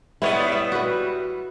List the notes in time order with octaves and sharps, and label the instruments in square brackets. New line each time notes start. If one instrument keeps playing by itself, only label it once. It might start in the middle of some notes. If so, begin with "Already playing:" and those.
[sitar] G3 B3 [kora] E4 C#5 D#5
[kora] E5
F#4 B4